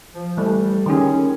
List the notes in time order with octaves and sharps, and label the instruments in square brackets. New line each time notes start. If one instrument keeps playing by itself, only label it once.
[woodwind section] F3
[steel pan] E3 A3 [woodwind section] G3
[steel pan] D#3 G4 G#4 [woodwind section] C#4